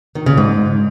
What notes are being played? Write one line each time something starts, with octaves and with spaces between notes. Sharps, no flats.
D#3
C#3
G#2